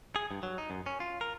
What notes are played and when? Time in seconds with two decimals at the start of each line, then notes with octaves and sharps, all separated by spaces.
0.16 G#4
0.31 G2
0.43 F#3
0.58 D#4
0.70 F#2
0.86 C#4
1.00 F4
1.21 A#4